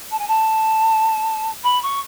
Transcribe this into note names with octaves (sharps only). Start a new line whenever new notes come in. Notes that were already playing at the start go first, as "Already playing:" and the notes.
A5
G#5
A5
B5
C#6